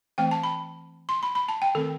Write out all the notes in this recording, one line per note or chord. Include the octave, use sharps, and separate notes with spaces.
E3 A3 C4 G5
A5
B5
C6
B5
B5
A5
G5
D#3 A3 C4 A4